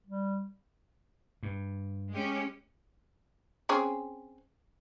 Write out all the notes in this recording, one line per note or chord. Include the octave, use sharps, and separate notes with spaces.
G3
G2
G#3 C#4 G4
C4 C#4 G#4